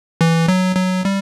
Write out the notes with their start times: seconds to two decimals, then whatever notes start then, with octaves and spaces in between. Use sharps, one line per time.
0.21 E3
0.48 F#3
0.76 F#3
1.05 G3